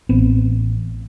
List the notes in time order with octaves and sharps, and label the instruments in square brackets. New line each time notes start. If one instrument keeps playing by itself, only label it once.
[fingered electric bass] A1 B3 C4